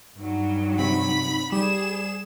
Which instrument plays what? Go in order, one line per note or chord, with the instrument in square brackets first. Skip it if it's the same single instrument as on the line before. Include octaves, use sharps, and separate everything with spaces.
[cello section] G2 F#3 [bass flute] D#4
[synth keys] C3 [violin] B5
[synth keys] G3 [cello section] G#4 [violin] E7